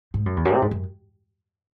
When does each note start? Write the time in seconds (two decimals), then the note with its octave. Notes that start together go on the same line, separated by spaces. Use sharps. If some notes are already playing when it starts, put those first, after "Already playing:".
0.14 G#2
0.26 F#2
0.36 E2
0.45 F#2
0.54 C3
0.62 G#2
0.71 F#2